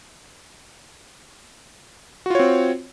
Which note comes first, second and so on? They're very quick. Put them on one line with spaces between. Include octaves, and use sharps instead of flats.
F#4 F4 C#5 C4